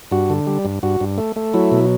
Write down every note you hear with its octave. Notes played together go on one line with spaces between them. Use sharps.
G2 F#4
D3
G3
G2
G2 F#4
G2
A3
A3
F#3 E4
B2